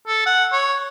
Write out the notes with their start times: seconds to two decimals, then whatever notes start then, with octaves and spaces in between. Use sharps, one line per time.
0.08 A4
0.26 F#5
0.52 C#5